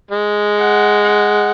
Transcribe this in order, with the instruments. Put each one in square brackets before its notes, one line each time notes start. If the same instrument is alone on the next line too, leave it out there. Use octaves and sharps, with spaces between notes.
[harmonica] G#3
[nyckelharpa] F#5
F#5